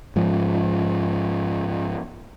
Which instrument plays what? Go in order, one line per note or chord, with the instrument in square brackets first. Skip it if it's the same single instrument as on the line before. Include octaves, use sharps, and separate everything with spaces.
[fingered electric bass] G#2 F3